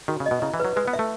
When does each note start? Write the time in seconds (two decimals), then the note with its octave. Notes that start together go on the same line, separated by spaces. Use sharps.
0.08 D#3 F#4
0.20 C#3
0.26 D#5
0.31 B2
0.42 C#3 E4
0.54 E3
0.60 B4
0.65 F#3
0.76 G#3 B4
0.88 B3
0.93 E5
0.99 A3